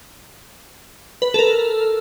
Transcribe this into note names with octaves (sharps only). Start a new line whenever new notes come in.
B4
A4 A#4